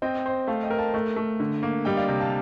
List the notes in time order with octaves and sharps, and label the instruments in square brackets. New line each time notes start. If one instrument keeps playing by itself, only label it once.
[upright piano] C4 [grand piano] D#5 G5
[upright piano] C5
[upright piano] A3 [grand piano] F5 A5
[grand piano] D#5 G5
[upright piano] A#4
[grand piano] F5 A5
[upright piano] A3
A3
D3
A#3
[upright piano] G3 [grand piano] D#5 G5
[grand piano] D5 F5
[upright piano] C3
[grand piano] F5 A5